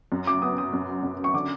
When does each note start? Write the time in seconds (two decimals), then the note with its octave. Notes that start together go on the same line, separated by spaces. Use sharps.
0.12 F#2
0.27 D6
0.42 B3 D#6
0.58 D#6
0.73 F#2
1.03 F#2
1.24 C#6
1.34 D3 D6